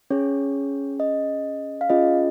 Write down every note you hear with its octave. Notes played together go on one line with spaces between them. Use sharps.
C#4 G#4 C#5
D#5
F5
C#4 F4 G#4 D#5